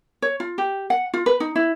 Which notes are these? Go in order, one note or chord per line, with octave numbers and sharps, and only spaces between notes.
C#5
F4
G4
F#5
F4
B4
D#4
E4